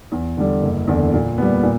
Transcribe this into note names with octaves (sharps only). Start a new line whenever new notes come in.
E2
D3 G3
F#1
E2 D3
A#2
G3 B3
A#2